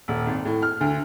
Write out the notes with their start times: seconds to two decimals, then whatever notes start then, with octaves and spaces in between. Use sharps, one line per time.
0.08 D#1
0.26 G#1
0.45 A2
0.62 F6
0.81 D2